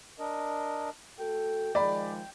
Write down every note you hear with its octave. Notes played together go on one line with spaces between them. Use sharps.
D4 A#4 D#5
A3 F#4 A4 G5
D#3 F3 G#3 D5 B5